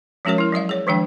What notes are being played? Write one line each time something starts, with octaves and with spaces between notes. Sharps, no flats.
F3 G#3 C#4 F#4 A#4 C#5
E4 A#4
F#3 G3 E5 F5
G#4 C#5
D#3 F3 G#3 D4 G5